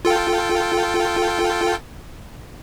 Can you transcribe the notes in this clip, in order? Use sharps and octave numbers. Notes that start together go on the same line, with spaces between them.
F4 A4 G5